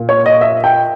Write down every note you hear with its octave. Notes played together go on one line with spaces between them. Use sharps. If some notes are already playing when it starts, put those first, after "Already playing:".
Already playing: A#2
C#5
D#5
E5
G5